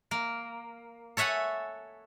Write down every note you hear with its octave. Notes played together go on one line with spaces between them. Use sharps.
A#3
A4 C#5 E5 F#5 G#5